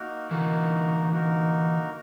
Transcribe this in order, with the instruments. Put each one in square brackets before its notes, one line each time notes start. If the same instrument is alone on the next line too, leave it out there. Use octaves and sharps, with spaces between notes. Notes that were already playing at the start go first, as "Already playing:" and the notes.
Already playing: [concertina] A#3 D#4 F#4 A#4
[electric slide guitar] D3 E3 [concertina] A#3 D#4 F#4 A#4
[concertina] A#3 D#4 F#4 A#4